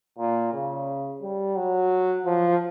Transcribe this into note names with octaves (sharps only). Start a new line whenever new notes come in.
A#2
C#3
G3
F#3
F3